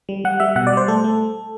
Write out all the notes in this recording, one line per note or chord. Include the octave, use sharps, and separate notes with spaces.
G3
G3 F#5
G3 E5
B2 F#5
D5
G3 C5
A3 A4
A3